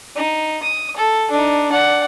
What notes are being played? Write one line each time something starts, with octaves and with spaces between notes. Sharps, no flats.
D#4
D#6
A4
D4 D#4
D5 F#5